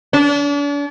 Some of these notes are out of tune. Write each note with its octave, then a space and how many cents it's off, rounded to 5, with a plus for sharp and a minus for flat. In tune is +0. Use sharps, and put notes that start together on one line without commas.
D4 -40